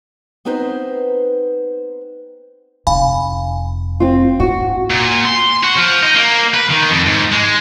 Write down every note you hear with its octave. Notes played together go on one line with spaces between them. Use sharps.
B3 C4 D#4 B4 C5
F1 F5 G#5 B5
C4 F4
G#2 F#4
A#2
C6
F#4
F3
D#4
A#3
B4
D#3
F2
G#2
G#3